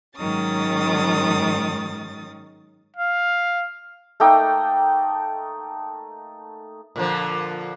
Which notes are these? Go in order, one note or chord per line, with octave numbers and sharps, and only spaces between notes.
G#2 D#3 F#3 C#4 D#6 A6
F5
A3 A#3 D#4 G5
A#2 D3 F3